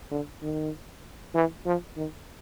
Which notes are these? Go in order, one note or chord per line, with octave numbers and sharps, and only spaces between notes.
D3
D#3
E3
F3
D#3